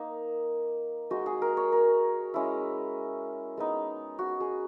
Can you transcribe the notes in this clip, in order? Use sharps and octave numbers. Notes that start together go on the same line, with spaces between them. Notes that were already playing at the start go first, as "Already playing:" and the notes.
Already playing: A#3 D#4
G#3 D#4 F#4
G#4
A#4
C#5
A#4
G#3 C#4 E4
G#3 B3 D#4
F#4
G#4